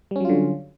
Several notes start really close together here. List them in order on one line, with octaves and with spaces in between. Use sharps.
G3 C#4 F#3 F4 D3